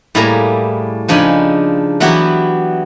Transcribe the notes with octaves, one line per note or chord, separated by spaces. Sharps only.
A2 G3 A#3 E4 G#4 A#5
C#3 F3 D4 D#4 G#5 B5
E3 F#3 B3 E4 F#4 G4